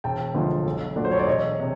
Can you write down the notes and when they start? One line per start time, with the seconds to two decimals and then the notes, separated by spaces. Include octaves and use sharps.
0.04 E1 G5 A5
0.35 D2 D3 F3 G#3
0.65 B1
0.96 A#2 F#3 A3 D4
1.05 C5
1.11 C#5
1.19 D5
1.27 E1 C#5 D#5
1.60 C3